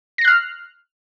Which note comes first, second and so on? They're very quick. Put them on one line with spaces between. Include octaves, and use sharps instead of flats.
A#6 C7 F#6 F6